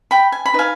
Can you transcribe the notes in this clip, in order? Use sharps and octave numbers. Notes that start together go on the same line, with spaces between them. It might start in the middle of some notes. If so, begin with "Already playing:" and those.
G5 B5
G#5
B5
D#4 B4 D#5
F5 G#5